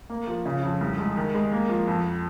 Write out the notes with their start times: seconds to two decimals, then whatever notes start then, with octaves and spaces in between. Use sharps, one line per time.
0.10 A#3
0.27 F3
0.46 C#3
0.63 F2
0.81 C2
0.99 G#3
1.17 D#3
1.34 G#3
1.53 A#3
1.69 F3
1.87 F2